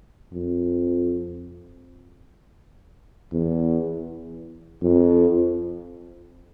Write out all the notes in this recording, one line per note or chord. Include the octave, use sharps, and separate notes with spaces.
F2
E2
F2